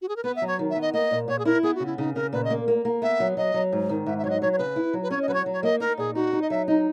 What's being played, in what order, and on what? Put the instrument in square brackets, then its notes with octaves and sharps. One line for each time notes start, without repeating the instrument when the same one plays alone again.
[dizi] F#4
G#4
A#4
[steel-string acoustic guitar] B3 [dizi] B4
[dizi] E5
[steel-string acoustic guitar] F#3
[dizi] C#5
[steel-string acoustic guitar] D#3
[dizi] E5
[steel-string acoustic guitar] B3
[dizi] D#5
[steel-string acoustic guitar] A#3 [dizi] D#5
[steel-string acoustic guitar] A#2
[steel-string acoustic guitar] A#2 [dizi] C#5
[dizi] G#4
[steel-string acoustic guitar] E4 [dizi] A#4
[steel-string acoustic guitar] B3 [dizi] G#4
[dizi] F#4
[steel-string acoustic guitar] C#3
[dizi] E4
[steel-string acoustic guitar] C#3 [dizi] D#4
[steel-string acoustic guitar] C#3 [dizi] A#4
[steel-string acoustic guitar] A#2 [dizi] B4
[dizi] D#5
[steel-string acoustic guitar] A#3
A#3
A#3
[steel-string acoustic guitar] B3 [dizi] E5
[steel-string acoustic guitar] F#3
[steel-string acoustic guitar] F#3 [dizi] D#5
[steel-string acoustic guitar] F#3
G#2
D#3
[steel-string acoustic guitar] G#2 [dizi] E5
[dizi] E5
[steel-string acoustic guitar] F#3 [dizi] C#5
[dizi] D#5
[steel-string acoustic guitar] F#3 [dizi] C#5
[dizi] C#5
[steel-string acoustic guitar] C#3 [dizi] B4
[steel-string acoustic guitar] E4
F#3
[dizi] B4
[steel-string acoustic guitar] C#4 [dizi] C#5
[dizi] D#5
[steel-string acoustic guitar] F#3 [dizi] B4
[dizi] C#5
[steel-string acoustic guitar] F#3
[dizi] C#5
[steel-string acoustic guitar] A#3 [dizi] D#5
[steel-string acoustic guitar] D#4 [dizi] A#4
[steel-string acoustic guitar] A#2 [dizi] G#4
[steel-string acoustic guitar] D#4 [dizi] F#4
[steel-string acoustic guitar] D#4
[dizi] D#5
[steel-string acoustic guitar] F#3 [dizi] E5
[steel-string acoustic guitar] D#4 [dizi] D#5